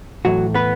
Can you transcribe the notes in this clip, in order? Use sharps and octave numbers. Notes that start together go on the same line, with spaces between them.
A2 E3 F#3 A3 F#4
B3 B4